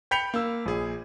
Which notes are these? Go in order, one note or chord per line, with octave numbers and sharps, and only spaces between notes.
G5 B5 G6 B6 C#7 F7
A#3 E6
A#1 G#4